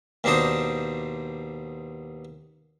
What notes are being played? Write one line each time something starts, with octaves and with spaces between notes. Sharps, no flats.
D#2 B2 D4 D#4 C5 D#6